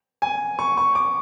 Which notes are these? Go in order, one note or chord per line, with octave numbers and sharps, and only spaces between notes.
G#5
C#6
C#6
D6